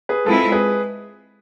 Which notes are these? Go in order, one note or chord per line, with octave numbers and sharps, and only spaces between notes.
G#4 B4
G#3 C4 E4 F4 A4
G#4 B4